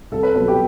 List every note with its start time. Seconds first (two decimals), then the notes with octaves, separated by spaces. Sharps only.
0.12 C2 A4
0.23 B4
0.35 B2 F#3 B4
0.48 G4